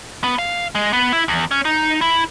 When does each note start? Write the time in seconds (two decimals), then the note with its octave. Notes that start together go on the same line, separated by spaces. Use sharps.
0.24 B3
0.39 F5
0.75 G#3
0.93 B3
1.13 E4
1.28 E2
1.51 C#4
1.65 D#4
2.01 E4